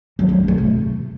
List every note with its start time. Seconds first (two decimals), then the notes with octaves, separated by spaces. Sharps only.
0.19 F#3
0.29 A#3
0.38 C#4
0.48 A3
0.58 C3